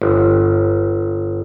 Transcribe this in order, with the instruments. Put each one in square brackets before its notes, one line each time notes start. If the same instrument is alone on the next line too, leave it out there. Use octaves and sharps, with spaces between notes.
[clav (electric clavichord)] G1